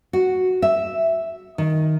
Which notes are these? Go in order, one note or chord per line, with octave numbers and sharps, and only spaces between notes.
F#4
E5
D#3